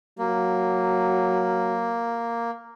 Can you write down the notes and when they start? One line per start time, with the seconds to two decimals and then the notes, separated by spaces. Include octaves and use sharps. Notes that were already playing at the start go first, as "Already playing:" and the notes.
0.19 F#3 A#3